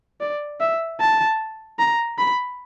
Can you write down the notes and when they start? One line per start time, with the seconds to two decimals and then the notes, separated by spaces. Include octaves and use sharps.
0.21 D5
0.60 E5
1.00 A5
1.79 A#5
2.18 B5